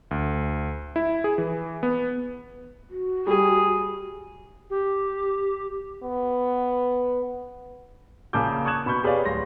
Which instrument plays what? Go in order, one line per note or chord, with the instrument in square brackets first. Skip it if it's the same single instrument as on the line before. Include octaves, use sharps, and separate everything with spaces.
[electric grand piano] D2
E4
G#4
E3
B3
[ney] F#4
[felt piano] G3 [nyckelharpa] G#4
[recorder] G4
[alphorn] B3
[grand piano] A#1 C#3 A#3 A5 D6 G6
A5 C#6 D#6 F#6 G#6 E7
B2 B5 C#6 G6
G4 G#4 B4 C#5 D5 F5
D1 C6 A#6